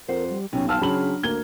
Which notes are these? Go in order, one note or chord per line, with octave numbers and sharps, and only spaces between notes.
F2 A#4 C5 F#5
G3
B1 F#2 C3 C#4
C4 F5 F#5 A5 E6 F6
C#3 F#3 D4 B5 F#7
D2 A#3 G#6 G7